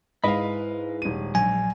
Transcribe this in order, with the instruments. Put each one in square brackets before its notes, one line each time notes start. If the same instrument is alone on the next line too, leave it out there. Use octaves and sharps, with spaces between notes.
[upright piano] G#2 [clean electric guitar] E4 B4 B5 [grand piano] D#5 F5
[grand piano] D#1 D#7
[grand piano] A#1 [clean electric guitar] F#3 [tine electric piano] G#5